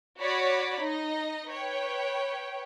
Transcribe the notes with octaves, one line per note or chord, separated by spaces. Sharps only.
F#4 C#5 D5 B5
D#4 D#5
B4 C#5 G5